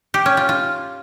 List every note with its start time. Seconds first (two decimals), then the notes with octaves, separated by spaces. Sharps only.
0.14 G4
0.26 C#4
0.37 F4
0.49 F4